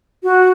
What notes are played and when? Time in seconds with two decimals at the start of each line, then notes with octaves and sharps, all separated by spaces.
0.23 F#4